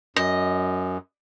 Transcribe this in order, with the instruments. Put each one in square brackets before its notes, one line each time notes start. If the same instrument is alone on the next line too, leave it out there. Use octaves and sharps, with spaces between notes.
[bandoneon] F#2 [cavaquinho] D#5